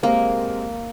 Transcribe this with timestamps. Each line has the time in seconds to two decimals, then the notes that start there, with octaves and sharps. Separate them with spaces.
0.03 G#3 A#3 C4 G4 A#4